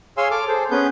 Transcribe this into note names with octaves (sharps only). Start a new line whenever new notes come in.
G#4 C#5 F5 G#5 C6 E6
A4 D6 F6
G#4 A4 C5
B3 C#4 G#4 B4 G6